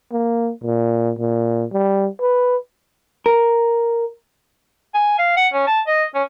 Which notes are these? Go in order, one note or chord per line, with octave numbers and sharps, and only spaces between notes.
A#3
A#2
A#2
G3
B4
A#4
G#5
F5
F#5
C#4
A5
D#5
C#4